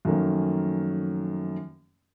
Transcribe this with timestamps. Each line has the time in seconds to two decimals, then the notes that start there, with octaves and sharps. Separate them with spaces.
0.05 F#2 D#3 F3 A3 A#3 C#4